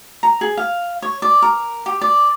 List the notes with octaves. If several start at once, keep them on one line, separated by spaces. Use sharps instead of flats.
A#5
G#4
F5
C#5
D5
A#4
G4
D5